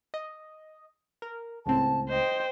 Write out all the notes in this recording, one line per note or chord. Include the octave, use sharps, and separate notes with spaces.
D#5
A#4
C#2 A2 C4 A5
C5 D#5 G5